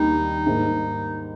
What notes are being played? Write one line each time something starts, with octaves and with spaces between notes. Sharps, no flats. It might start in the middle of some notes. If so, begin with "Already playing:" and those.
Already playing: D#2 D#3 G3 D4 D#4
G#2 G3 A#3